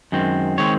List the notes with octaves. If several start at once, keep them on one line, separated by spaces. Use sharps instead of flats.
F#2 D#3 G#3 C4
D#3 G#3 C4 C#5